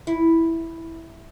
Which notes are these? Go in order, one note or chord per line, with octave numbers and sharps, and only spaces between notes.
E4